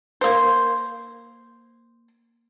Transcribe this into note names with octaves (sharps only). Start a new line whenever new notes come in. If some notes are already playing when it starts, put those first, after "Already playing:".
A#3 C5